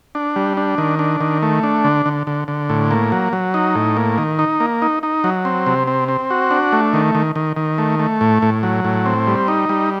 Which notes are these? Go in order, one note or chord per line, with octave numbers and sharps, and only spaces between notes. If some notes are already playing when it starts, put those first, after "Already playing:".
D4
G3
D4
D#3
D4
D#3
A3
D4
D3
D3
D3
D3
A2
A#3
F#3
F#3
D#4
A2
A#3
D#3
D#4
A#3
D#4
D#4
F#3
C4
C3
C4
C4
F#4
D4
A3
D#3
D#3
D#3
D#3
A3
A3
A2
A2
F#3
A2
C4
G3
D#4
G3